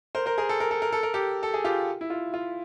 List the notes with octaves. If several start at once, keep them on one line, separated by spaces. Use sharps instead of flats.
A#4 C5
A#4 C5
G#4 A#4
A4
A#4
A4
A#4
A4
A#4
G4 A4
A4
G#4
F4 G4
E4
F4
F4